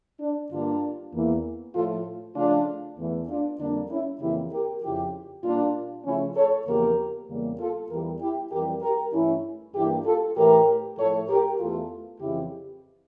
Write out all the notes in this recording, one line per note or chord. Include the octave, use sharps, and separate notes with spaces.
D4
G2 D3 G3 A#3 D4 F4
E2 E3 A#3
A2 F3 A3 F4 A4
C#3 F3 A3 D4 F4
E2 E3 A3
D4 F4
F2 D3 G3 A#3 D4
C#4 E4
F2 C#3 E3 A#3 E4 G4
G4 A#4
F2 C#3 F3 E4 G4
A#2 G3 A#3 D4 F4
C#3 F3 A3 C#4 E4
A4 C#5
E2 C#3 F3 A#3 G4 A#4
E2 C#3 G3 A#3
F4 A4
E2 E3 G3 G4 A#4
E4 G4
F2 E3 G3 G4 A#4
G4 A#4
G2 E3 A3 C#4 E4
G2 E3 A#3 E4 G4
F4 A4
A2 E3 A3 G4 A#4
A2 F3 A3 A4 C#5
G4 A#4
E2 E3 A3 F4 A4
F2 C#3 E3 E4 G4